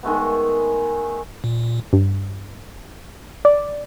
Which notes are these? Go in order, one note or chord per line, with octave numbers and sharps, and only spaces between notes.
D#3 G#3 A3 B3
A#2
G2
D5